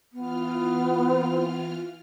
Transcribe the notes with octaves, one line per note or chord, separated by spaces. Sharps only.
E3 B3 F4 F6